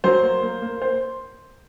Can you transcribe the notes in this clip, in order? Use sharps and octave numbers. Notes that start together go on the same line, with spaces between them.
F#3 C5
A#3
A#3
A#3
C5